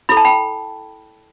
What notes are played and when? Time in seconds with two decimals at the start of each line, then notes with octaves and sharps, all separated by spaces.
0.09 E4 A4 B5
0.17 A5
0.25 G5 B5